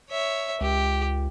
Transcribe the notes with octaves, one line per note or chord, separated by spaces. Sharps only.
C#5 E5
C#2 G4